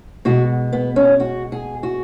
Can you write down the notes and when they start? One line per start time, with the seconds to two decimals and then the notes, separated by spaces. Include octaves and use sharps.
0.25 B2 G#3 F#4
0.73 B3
0.96 C#4
1.20 F#4
1.52 G#4
1.83 F#4